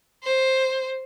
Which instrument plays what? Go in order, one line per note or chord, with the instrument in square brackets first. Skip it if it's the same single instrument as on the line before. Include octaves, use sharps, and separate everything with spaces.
[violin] C5